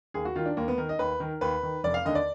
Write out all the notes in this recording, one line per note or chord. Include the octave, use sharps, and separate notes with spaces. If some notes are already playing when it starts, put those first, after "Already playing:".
D#2 G#4
F#4
D#3 F4
D4
D#2 A#3
B3
D#3 A#4
D#5
D#2 B4
D#3 A#4
D#2 B4
D#3
F1 D5
F5
D#2 D3 D#5
D5